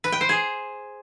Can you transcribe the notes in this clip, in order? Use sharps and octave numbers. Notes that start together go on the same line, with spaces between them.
B4
G5
C5
G#4